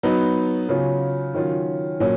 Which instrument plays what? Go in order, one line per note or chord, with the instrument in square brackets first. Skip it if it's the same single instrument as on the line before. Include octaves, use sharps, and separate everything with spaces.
[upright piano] F#3 B3 D#4
C#3 F#3 C#4 F4
D#3 F#3 C#4 F4
A#2 F#3 C#4